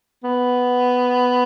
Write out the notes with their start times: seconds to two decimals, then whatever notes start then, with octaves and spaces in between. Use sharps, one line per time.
0.24 B3